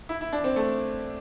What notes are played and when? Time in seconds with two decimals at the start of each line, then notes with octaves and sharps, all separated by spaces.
0.09 E4
0.21 E4
0.33 D4
0.44 C4
0.56 A3